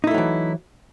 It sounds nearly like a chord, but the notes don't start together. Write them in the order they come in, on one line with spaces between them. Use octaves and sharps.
D#4 E4 A3 F#3 E3